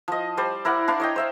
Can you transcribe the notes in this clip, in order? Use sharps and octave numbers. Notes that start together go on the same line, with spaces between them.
F3 D#5
G3 C5 D5
E4 A#4 D5 F#5
D4 E4 F5 C6
C#5 D#5 G5
C5 E5 F5